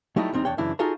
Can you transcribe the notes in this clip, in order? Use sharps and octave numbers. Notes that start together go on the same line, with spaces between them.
F#3 G3 A3 D#4 E4 D#5
E2 G3 C4 D#4
E2 D4 C#5 G5
F#2 C#3 E3 D4 E4
D#4 F4 F#4 G#4 A4 A#5